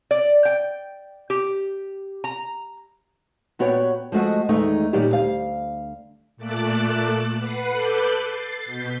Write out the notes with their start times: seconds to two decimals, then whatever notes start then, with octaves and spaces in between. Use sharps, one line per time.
0.11 D5
0.45 G5
1.30 G4
2.24 A#5
3.59 A#2 B3 F#4 C#5 G5
4.12 F3 G#3 A3 F#4 D#5
4.49 E2 D#3 G#3 A3 D#4
4.93 A#2 D#3 F#3 G3 G4
5.11 D2 F5
6.37 A#2 A3 A5 D6 F#6
7.38 B4 F#5 C7
7.71 A4 B4 D6 F#6 G6
8.27 A6 C7
8.66 B2 G6 B6